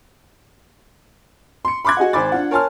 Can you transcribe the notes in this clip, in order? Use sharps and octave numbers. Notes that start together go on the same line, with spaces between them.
C6 C#7
B5 C6 D6 F#6 G#6
F#4 G#4 D#5 F#5
G#1 C5 G#5 B5 D6 A6
D4 F4 F#5
A#4 C#5 G#5 A5 C6 F6